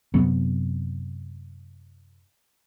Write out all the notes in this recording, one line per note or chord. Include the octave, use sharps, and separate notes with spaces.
F#2 C3 F#3 B3